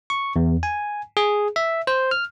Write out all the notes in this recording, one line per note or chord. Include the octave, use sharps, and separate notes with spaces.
C#6
E2
G#5
G#4
E5
C5
F6